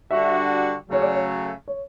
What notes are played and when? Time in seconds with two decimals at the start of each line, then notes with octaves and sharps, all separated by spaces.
0.11 D3 G3 D4 F#4 E5
0.89 C#3 F#3 A3 C#5
1.02 D5
1.15 C#5
1.68 C#5